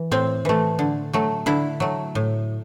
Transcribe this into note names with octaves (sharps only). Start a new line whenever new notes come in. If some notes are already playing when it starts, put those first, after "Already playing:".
Already playing: E3
A2 C4
E3 A3
D3
F#3 A3
D3 E4
F#3 A3
A2